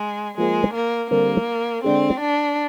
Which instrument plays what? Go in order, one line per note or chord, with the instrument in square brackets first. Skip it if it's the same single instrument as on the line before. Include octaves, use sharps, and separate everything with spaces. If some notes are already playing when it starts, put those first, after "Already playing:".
Already playing: [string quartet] G#3
[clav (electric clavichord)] F3 A#3 F4 G#4 C5 [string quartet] G#3
[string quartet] A#3
[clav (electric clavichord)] D3 G3 C4 G4 A#4 [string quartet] A#3
[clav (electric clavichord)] D3 G#3 D4 G#4 [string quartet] C4
[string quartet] D4